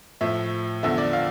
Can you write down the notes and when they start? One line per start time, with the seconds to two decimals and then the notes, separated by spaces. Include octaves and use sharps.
0.21 A2 F3 E5
0.83 E2 D3 F3 E5
0.98 D5
1.13 F5